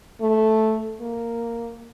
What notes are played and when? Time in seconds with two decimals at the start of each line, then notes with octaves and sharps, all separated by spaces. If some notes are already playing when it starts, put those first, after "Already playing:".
0.21 A3
1.01 A#3